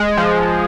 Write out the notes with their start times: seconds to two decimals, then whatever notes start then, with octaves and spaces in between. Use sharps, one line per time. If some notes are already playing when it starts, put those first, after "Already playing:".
Already playing: G#3
0.17 F3